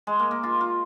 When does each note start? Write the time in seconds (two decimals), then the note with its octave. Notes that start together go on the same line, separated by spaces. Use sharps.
0.07 G#3
0.19 A#3
0.31 A#3
0.43 F4
0.61 F4